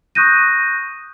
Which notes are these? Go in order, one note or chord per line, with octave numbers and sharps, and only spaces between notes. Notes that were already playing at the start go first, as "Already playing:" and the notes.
C#6 D#6 F#6 G6 A#6 D#7